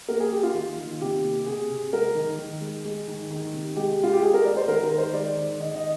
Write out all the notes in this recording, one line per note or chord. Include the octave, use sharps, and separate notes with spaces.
A#3 A#4
G#4
A#3 G4
F4
D#3
D#3
C3 G4
A#3
C3 G#4
C3
G#3 A#4
D#3
D#3
G#3
G#3
D#3
D#3
C3
G#3 G4
G#3 F4
G4
G#3 G#4
A#4
G#3 D5
C5
D#3 A#4
A#4
D#3
C5
G#3 D5
D#3
D#3 D#5
D#5